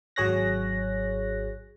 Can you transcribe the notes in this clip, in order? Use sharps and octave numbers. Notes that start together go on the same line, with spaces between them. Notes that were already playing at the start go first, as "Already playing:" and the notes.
G#1 F#3 G#4 C#5 F#6 A#6